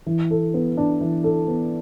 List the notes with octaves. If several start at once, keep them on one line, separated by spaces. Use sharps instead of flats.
E3
A4
B3
D4
E3
A4
B3